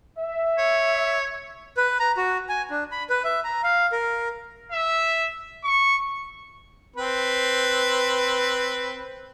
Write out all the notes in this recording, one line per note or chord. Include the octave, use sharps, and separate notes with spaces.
E5
C#5
B4
A#5
F#4
G#5
D4
B5
B4
E5
A#5
F5
A#4
E5
C#6
C4 B4